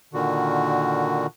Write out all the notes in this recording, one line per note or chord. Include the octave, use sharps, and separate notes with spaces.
A#2 D3 D#3 F#4